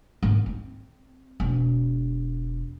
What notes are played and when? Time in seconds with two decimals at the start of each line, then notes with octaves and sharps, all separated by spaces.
0.23 G#2 D#3
0.46 C4
1.40 E1